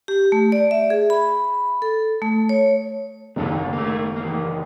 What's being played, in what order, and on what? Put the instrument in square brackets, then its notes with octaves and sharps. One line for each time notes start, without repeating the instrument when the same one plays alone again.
[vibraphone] G4
A3
D5
E5
G#4
B5
A4
A3
C#5
[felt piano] F#1 D#2 [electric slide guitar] C3 D4 A4
[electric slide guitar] A3 A#3
E2 A#3